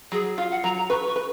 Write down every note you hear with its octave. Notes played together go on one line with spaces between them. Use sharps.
F#3 G#4
F4 F5
F#5
F#3 A#5
A#5
B4 C#6
C#6
B4